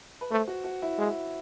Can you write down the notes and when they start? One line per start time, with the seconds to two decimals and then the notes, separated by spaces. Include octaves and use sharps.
0.21 B4
0.31 A3 C5
0.48 F#4
0.64 F#4
0.82 E4
0.98 G#3